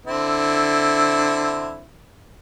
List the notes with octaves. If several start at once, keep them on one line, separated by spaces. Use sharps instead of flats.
D3 C4 E4